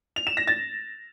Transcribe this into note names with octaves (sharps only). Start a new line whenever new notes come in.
F7
E7
A#6
A6